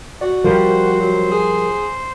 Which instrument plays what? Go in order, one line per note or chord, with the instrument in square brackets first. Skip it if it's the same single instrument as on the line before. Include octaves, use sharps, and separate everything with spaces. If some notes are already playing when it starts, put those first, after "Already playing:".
[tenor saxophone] F#4 [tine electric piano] D5
[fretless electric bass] F3 G3 [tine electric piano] A#4 [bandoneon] C5
[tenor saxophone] F#3
G#4